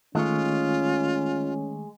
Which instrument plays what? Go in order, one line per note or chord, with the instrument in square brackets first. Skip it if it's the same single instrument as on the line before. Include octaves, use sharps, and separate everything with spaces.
[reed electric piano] D#3 A3 C#6 [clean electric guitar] G#3 [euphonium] C#4 [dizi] F4